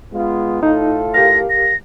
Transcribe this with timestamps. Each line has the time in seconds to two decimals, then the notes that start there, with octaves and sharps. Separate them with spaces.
0.14 G#3 B3 F4
0.63 A2 D#4 F4 A4
1.14 G4 A#4 F5 A#6
1.50 A#6